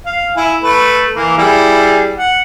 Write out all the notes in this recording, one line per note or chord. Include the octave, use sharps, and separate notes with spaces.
F5
E4 G#5
A3 B4
E3 A#3
G3 E4 G#4
F#5